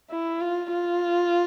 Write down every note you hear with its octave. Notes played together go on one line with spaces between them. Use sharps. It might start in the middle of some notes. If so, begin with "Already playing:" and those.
E4
F4
F4